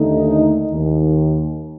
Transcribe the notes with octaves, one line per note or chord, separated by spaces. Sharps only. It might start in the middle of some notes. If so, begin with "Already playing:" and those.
Already playing: D#2 D3 A3 D#4
D#2 D#3